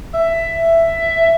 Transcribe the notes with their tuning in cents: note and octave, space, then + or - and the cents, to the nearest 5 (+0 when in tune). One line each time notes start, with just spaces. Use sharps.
E5 +10